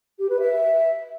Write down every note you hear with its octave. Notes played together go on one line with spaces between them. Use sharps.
G4
B4
E5